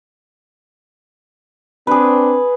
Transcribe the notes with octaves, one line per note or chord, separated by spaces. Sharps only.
C4 D4 G#4 B4